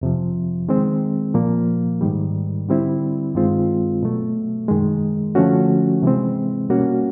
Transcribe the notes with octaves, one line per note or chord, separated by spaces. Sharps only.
F2 C3 F3
D#3 G#3 C4
A#2 F3 A#3
G#2 D#3 G3
D3 G3 C4 E4
G2 D#3 G#3 C4 F4
B2 F#3 A3
F#2 D#3 G#3
D3 F3 A3 C#4 F#4
C3 E3 G#3 C4
B2 G3 A#3 C#4 F#4